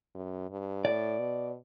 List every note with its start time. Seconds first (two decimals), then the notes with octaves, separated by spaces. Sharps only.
0.15 F#2
0.50 G2
0.85 A2 D5
1.19 B2